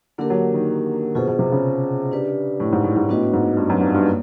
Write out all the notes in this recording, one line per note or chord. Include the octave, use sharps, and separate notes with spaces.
D3 A#3 D4 G4 A#4
F#3
D#3
B2 F4 G#4 C5
B2
C3
C#3
D4 G4 B4 D5
A2
G#2
A2
G#2
A2 B3 D4 F#4 B4 D#5
G#2
G2
F#2
G2
G2
A#3